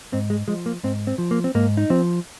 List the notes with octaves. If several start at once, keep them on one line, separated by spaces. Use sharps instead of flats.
G#2 C4
G#3
F3 G#3
A#3
G#2 C4
C4
F3
A#3
C4
G#2 A#3
D#4
F3 C4